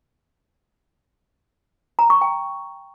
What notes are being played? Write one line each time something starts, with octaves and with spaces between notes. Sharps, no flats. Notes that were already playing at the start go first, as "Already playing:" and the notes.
A#5
C#6
G5